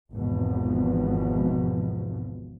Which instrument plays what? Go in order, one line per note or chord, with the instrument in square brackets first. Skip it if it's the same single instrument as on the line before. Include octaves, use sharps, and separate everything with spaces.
[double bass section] G#1 E2 B2 F3